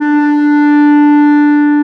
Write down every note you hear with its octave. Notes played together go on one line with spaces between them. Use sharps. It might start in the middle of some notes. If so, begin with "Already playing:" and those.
D4